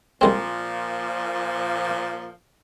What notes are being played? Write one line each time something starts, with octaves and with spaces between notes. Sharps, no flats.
C2 A#2 F3 G#3 C4